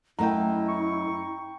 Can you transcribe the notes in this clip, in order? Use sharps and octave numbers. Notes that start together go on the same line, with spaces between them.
F#2 A3 E4 D#5 G5 A#5
C#6